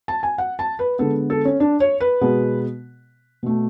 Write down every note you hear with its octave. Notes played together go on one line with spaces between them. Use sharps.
A5
G#5
F#5
A5
B4
D3 G#3 B3 A4
A4
C#4
D4
C#5
B4
B2 G#3 B3
B2 A3